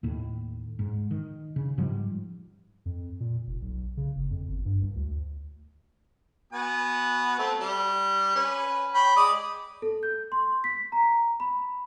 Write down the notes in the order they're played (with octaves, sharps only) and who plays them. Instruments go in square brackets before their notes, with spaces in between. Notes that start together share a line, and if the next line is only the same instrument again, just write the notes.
[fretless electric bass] D#2 A2
G#2
D#3
C#3
G#2 F3 G3
[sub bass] F2
A#2
F1
B1
C#3
F#1
F2
G1
G2
C2
D2
[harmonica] B3 F#4 G#5
A3 C4
G3
C#4 B4
C#5 G5 B5
G#3 D5 D#6
[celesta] A4
G6
C6
B6
A#5
B5